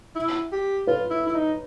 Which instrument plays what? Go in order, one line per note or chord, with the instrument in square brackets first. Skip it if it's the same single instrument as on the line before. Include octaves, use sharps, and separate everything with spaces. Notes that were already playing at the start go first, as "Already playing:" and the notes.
[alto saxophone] E4
G4
[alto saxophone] F4 [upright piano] B4
[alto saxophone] E4
E4
D#4